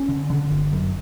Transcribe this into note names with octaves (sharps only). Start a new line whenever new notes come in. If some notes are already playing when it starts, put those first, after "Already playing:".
Already playing: C#4
D3
D3
G1
F#2